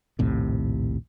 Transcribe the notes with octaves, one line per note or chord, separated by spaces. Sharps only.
A#1 D#2 A2 C3